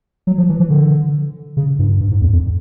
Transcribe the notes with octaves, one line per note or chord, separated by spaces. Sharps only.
F#3
F3
E3
E3
D3
C#3
G2
G2
G#2
E2
F2